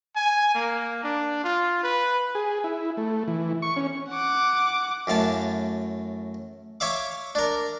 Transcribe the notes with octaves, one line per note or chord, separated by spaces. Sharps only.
G#5
A#3
D4
F4
B4
G#4
E4
A3
E3
C#6
C#4
F#5 D6
F#2 A2 F5 A5
C#5 E5 F5 D6
D4 A#4